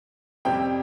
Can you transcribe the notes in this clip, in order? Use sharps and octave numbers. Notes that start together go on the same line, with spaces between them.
F2 C3 G3 C4 G4 G5